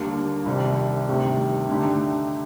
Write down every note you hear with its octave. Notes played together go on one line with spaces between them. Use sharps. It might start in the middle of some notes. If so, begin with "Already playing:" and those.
Already playing: D#2 D3 G3 A#3
C2 C3 D#3
D2 C3 D#3 G3
D3 A3 D#4 G4